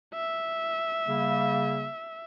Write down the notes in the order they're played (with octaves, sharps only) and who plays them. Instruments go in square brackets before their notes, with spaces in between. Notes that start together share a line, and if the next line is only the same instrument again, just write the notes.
[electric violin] E5
[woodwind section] C#3 G3 A#3